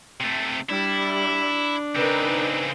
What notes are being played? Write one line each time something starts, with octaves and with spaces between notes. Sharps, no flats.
C3 A3
G3 D4 E4
C#3 C4 D#4 A#4 B4